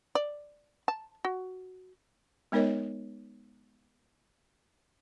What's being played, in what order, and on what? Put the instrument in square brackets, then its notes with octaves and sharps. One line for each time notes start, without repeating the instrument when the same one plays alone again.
[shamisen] D5
A5
F#4
[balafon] G#3 B3 D#4 A#4 C#5 D#5